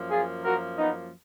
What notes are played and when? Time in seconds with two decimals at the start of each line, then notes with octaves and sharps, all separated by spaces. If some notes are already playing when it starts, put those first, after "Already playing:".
Already playing: F#2 F3 A#3
0.11 F4 G#4
0.44 F#4 A#4
0.78 B3 D#4